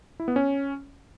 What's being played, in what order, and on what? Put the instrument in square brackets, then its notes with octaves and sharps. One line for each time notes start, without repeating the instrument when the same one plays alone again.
[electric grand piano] E4
B3
C#4